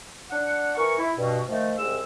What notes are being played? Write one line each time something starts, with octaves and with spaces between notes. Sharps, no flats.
D4 F#5
E3 A#4 C#6
E4
G2 B2
D#3 F3 A3
C2 G#3 E6